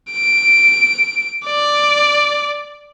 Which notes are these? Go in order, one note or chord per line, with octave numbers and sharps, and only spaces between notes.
D7
D5